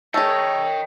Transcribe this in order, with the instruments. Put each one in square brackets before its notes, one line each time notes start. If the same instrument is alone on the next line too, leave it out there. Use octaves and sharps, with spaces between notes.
[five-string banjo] A3 G#4 [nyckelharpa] C#5 [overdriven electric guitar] D#5 G5